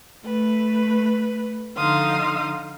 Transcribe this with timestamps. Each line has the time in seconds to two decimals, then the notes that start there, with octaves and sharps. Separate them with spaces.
0.25 A3 B4
1.77 D3 F3 D#4 F5 C6 D#6